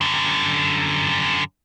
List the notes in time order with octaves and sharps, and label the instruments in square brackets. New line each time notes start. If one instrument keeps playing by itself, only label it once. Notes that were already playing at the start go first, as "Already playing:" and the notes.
[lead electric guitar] F#2 D3